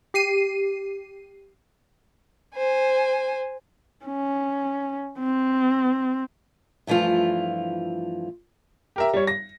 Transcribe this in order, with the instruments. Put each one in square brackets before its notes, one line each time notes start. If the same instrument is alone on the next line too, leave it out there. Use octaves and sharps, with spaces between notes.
[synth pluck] G4 C7 D#7
[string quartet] C5 G#5
[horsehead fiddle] C#4
C4
[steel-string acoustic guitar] G2 E3 F3 A3 F4
[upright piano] G4 A#4 E5
G3 C#5
A#6